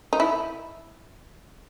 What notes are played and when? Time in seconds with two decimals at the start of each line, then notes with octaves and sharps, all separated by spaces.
0.13 D#4
0.20 E4